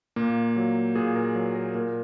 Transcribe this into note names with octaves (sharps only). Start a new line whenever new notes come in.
A#2 A#3
F#3
A#2 G#4
A#4
F#3
A#4
A#2 A#4